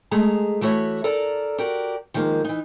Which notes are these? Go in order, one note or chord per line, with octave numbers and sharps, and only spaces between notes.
G#3 A3 G#4 A#5
E3 A3 F#4 C#5 E5
A4 A#4 D5 A#5
F#4 G4 A#4 D5
D#3 F3 G#3 A#3
E3 D#4